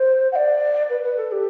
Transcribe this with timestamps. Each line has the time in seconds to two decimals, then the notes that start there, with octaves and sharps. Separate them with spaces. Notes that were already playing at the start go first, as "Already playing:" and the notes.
Already playing: C5
0.32 F#5
0.36 D5
0.90 B4
1.03 B4
1.17 A4
1.32 G4